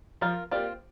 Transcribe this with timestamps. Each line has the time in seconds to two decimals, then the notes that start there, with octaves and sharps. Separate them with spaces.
0.21 F3 F4 A#4
0.51 A#3 C4 F4 G4 D5